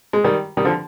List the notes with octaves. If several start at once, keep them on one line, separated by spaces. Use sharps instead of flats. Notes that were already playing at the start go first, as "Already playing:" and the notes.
G#3
D#3 G3
D#3 G3
D3 F3